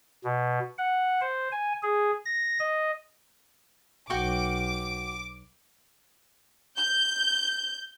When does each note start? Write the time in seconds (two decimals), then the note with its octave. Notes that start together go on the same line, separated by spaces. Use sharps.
0.24 B2
0.78 F#5
1.21 C5
1.52 G#5
1.83 G#4
2.25 A#6
2.60 D#5
4.10 B1 F#4 G5 C#6 D6
6.77 G6